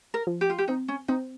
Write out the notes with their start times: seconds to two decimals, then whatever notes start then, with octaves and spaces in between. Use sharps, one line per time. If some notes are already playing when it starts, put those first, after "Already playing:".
0.14 A#4
0.27 F3
0.41 G4
0.50 F4
0.58 G4
0.68 C4 D#4
0.88 C#4
1.08 C4 D#4